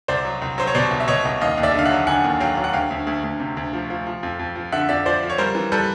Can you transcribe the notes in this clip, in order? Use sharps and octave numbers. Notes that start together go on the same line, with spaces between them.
C2 C5 D5
F#3
C2
F#3 C5
C#5
B2 C5 D5
C2
E5
B2 C#5 D#5
C2
D#2 D#5 F5
D#2
D5 E5
D3 F5
E5 F#5
F#3
D3 F#5 G#5
D#2
F#3 F5 G5
F#3 F5
F#5
D2 F5 G5
D2
D2
D2
C3
D2
F3
F3
F3
F2
F2
F3
D3 E5 F#5
F2 D5 E5
F3 C5 D5
F3
C#5
G3 A#4 C5
E3
G3 A4 B4